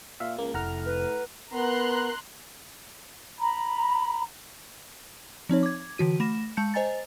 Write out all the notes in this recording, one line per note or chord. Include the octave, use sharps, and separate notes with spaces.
A#2 E5 F5
C#2 A#3
F1 A2 F#5 A#5 F6
B4
B3 A#4 A#5 C6 F#6
A#5 B5
F3 C4 D#4 C#5
D6 G#6
D3 E3 F#4 D#7
A3 B5 A#6 E7
G#3 A5 G6 C#7
C5 D#5 G#5 A#5 A6